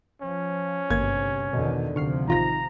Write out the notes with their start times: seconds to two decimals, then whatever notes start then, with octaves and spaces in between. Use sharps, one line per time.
0.22 F3 C#4
0.90 G#1 D2 G2 C3 A#3 G#6
1.53 E2 B2 D3 D#3
1.96 D2 C3 F3 C#6 F6 C7
2.28 A1 D#3 F4 A#5 G6 A#6